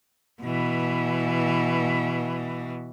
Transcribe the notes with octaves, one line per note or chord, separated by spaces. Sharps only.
B2 E3